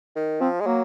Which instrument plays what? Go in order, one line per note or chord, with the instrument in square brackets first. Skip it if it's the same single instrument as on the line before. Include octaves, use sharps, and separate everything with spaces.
[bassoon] D#3
[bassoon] F3 [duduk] C4
[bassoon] G#3
[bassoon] F#3 [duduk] A#3